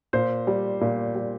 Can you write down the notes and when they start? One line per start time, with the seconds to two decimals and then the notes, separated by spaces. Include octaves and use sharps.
0.13 A#2 C5
0.47 G3
0.81 A#2
1.15 G3